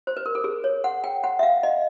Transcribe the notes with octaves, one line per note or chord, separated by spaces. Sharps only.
C5
B4
A#4
A4
G#4
C#5
F#5
G5
F#5
E5
F5
D#5